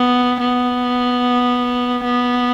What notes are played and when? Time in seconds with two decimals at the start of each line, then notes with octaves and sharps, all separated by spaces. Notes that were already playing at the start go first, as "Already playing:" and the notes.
Already playing: B3
0.41 B3
2.04 B3